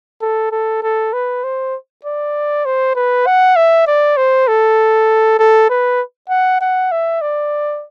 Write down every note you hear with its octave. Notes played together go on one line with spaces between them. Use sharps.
A4
A4
A4
B4
C5
D5
C5
B4
F#5
E5
D5
C5
A4
A4
B4
F#5
F#5
E5
D5